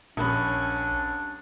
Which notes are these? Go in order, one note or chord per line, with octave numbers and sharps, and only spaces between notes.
D#1 A#1 C#4 D4 B5